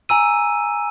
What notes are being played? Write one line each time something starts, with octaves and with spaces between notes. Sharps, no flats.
G#5 A#5 E6 D#7